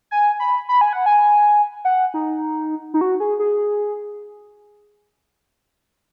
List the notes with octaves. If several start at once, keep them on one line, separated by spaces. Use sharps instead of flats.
G#5
B5
B5
G#5
F#5
G#5
F#5
D#4
D#4
F#4
G#4
G#4